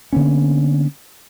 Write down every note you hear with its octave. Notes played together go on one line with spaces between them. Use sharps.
D3 A#3 B3 C#4